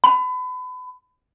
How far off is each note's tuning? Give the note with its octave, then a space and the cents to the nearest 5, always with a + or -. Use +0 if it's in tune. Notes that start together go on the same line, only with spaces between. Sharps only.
B5 +30